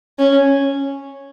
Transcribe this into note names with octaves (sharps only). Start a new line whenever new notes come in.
C#4